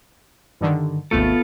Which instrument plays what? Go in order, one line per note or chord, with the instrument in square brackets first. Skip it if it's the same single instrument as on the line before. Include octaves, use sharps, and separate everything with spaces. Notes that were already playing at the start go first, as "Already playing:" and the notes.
[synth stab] G2 D3 D#3
[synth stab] G#1 D#2 A3 [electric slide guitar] B3 F4 A4